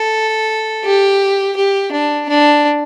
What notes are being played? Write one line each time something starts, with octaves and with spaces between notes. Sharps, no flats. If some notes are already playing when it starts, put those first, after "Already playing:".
Already playing: A4
G4
G4
D4
D4